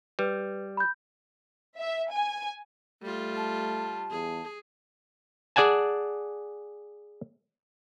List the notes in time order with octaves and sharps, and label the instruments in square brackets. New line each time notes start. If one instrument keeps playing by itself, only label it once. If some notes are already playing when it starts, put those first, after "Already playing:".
[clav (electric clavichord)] G3 [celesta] B4
[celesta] B5 G6
[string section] E5
G#5
[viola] G3 F4 [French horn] A3
[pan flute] A5
[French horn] E2 [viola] G#4
[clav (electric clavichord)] G#4 D5 F#5 G#5 A5